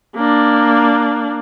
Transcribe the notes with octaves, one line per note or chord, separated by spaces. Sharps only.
A#3 D4